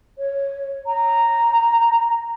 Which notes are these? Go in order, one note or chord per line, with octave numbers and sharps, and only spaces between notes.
C#5
A#5